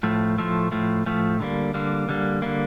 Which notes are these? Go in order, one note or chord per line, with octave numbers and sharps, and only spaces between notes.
A2 F3 A3
A2 F3 A3
A2 F3 A3
A2 F3 A3
D3 G3 A#3
D3 G3 A#3
D3 G3 A#3
D3 G3 A#3